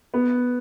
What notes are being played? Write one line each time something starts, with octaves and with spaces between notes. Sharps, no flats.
B3